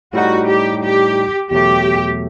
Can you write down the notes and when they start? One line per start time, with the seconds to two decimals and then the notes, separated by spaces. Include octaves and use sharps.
0.13 A2 G3 D#4 F#4
0.48 G4
0.83 G4
1.51 E2 B2 F#3 A3 G4